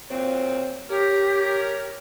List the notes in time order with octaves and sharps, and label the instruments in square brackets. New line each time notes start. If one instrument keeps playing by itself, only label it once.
[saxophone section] A#2 F#3 C4
[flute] G4 [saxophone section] A#4 C#5